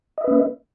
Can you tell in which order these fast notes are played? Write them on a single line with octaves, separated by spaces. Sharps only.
D#5 E5 B4 C#4 A#3